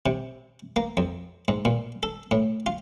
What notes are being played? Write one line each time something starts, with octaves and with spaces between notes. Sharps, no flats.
C3
A#3
F2
G#2
A#2
A4
A2
F4